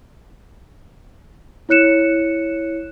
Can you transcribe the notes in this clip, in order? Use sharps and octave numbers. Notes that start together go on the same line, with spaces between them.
E4 C#5 F#6 C#7 E7